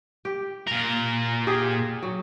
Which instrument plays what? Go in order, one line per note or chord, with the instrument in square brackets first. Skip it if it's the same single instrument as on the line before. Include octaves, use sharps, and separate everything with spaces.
[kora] G4
[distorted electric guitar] A#2 A#4
[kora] G4 G#4
F#3